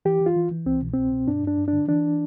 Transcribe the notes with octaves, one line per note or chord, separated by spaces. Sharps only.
E3 G4
E3
F4
E3
E3
C2 C4
B2
C2 C4
B2
G2 D4
G2 D4
G2
D4
D3
E3 D4